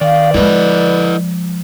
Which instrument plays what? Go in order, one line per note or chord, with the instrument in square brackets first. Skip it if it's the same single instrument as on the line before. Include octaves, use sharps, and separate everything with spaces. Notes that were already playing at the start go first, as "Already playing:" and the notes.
[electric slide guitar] D#3 [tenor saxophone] D5 [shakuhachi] F5
[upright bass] F3 G#3 [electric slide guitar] E4 A4 D#5 [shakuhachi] B4